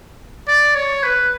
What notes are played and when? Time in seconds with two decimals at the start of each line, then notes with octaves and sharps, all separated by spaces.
0.48 D5
0.75 C#5
1.03 B4